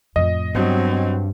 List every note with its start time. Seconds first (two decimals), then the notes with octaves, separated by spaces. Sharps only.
0.16 F2 A2 D#5
0.55 G2 F#3 B3 C4